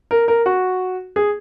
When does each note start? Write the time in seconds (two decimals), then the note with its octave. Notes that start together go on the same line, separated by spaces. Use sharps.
0.11 A#4
0.28 A#4
0.46 F#4
1.16 G#4